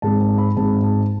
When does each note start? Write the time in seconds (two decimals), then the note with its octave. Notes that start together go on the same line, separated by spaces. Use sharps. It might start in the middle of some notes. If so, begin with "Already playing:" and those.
0.02 G#2 G#3 C4 A5
0.21 A5
0.38 B5
0.56 G#2 G#3 C4 A5
0.83 A5